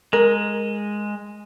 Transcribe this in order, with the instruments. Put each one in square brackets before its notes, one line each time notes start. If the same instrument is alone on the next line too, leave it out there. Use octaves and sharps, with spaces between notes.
[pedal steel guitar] G#3 [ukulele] A#4